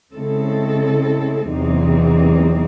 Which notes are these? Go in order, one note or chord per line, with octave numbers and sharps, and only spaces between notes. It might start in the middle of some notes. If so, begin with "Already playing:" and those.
C#3 G#3 C4 E4 A4
E2 C3 F#3 C4 D#4